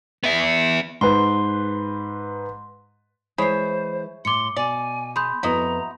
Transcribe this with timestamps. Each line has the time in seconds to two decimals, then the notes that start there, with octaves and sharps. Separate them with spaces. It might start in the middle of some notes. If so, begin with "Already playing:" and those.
0.24 B3 E5
1.01 G#2 B4 C6
3.38 E3 G#3 E4 G#4 C5 C#5 B5 C7
4.25 A2 C6 D6 C#7
4.56 B2 D5 G#5
5.16 G#4 B5 C6 G6
5.43 F2 B3 E4 F#4 D#5 A#5